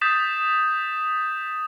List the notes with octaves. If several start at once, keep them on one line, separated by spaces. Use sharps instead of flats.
D#6 G6 A6 B6 E7